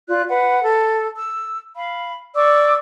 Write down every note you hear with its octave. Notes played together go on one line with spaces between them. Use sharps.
F4 D5 F#6
B4 F#5
A4
E6
F5 B5
D5 C#6 D6 E6